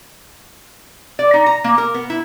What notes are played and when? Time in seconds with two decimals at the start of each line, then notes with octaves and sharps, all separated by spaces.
1.19 D5
1.34 D#4
1.46 A#5
1.64 A#3
1.78 A#4
1.94 B3
2.10 E4